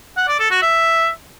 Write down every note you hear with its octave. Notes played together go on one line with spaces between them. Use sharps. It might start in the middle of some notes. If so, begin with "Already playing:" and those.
F#5
D5
A4
F#4
E5